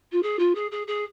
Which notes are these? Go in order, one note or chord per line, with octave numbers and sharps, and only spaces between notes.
F4
G#4
F4
G#4
G#4
G#4